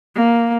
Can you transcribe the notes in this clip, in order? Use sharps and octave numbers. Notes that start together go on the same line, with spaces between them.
A#3